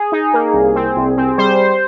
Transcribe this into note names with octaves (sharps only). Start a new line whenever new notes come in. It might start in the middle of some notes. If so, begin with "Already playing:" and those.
Already playing: G#4
D#4
A#3
C2
C4
C2
C4
G3 C5